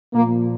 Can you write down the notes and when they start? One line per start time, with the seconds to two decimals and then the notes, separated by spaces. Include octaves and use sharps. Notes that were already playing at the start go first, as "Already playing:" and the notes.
0.14 A#2 F3 A#3